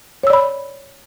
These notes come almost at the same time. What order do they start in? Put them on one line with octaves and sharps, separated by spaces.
C#5 E6 D5 B5